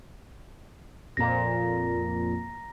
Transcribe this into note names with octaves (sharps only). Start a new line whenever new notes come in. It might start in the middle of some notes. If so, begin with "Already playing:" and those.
F2 A#2 A#5 A#6